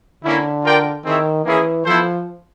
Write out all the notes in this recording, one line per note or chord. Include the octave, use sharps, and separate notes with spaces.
D3 A#3 C#4 E4
F4 A#4 D5 G5
D#3 C4 E4 G#4 C#5 E5
E3 A#3 C#4 E4 G#4
F3 B3 E4 A4 C5